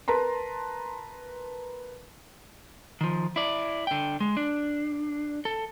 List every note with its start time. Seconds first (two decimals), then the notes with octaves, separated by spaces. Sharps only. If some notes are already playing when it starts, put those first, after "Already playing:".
0.08 A#4 B4 A5 A#5 C6
3.01 D#3 F3
3.36 E4 D5
3.87 D3 G5
4.20 G#3
4.37 D4
5.45 A4